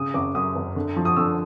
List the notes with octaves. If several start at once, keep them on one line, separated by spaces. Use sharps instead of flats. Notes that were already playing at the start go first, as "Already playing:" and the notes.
Already playing: C#3 D#6
F#1 D6
F#2 D#6
F#1
D3
F3
D#6
D3 E6